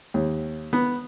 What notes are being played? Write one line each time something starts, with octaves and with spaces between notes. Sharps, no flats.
D#2
B3